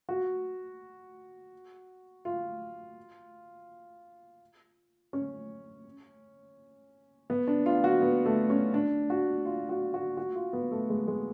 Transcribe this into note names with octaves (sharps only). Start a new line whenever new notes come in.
F#4
F4
C#4
B3
D4
F4
F#4
B3
A3
C#4
D4
F#4
F4
F#4
F#4
F#4
F4
B3
A3
G#3
G#3